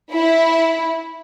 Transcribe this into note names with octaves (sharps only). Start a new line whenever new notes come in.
E4